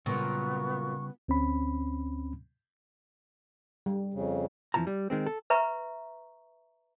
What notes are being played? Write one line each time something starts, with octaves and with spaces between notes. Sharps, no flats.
A#2 C#3 F#3 G3 B3 F4 C#6
D2 C4 C#4 B5
G3
F2 C#3
F2 E3 F3 A5 A#5
G3
D#3 G#3 C4
A4
B4 E5 A#5 C#6